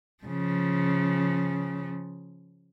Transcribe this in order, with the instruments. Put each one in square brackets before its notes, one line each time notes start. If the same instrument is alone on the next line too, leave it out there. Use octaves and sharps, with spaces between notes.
[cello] C#3 F3